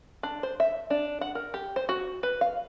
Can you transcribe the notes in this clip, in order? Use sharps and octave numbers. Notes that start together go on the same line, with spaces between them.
D4
C5
E5
D4
F#5
A#4
G4
C5
F#4
B4
F5